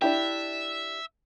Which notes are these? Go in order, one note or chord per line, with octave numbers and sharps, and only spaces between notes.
D4 E4 G4 E5